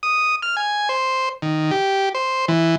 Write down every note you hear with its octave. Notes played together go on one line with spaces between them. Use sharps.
D#6
F6
G#5
C5
D#3
G4
C5
E3